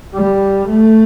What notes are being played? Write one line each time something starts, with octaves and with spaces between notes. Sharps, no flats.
G3
A3